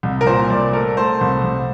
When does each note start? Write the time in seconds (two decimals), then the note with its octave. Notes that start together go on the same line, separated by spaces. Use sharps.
0.03 C2
0.21 A#4
0.27 A#2 C5
0.50 C2 D5
0.73 A3 A#4
0.97 A3 C5
1.21 C2
1.44 C2